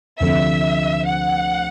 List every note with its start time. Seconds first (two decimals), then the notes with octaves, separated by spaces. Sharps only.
0.20 D2 C3 F3 A3 D4 E5
1.07 F#5